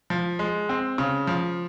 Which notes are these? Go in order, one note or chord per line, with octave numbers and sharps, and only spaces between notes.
F3
G#3
C4
C#3
F3